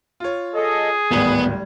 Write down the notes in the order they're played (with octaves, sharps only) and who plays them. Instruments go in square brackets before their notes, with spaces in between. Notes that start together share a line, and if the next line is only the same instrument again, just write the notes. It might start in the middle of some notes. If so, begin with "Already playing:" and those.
[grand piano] F4 C#5
[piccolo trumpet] G#4 [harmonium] A4 D#5
[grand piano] D1 G#1 G#6 [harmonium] G3 [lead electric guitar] B3